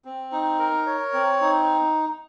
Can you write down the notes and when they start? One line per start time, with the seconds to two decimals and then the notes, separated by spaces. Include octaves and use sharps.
0.05 C4
0.32 D#4
0.59 A#4
0.86 C#5
1.13 C4
1.41 D#4